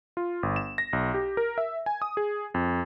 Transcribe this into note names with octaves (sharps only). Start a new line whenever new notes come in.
F4
G1
E7
A#6
B1
G4
A#4
E5
G#5
D#6
G#4
F2